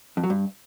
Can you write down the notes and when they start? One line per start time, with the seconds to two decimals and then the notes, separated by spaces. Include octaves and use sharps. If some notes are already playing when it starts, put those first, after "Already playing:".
0.17 F2
0.24 F#3
0.30 G2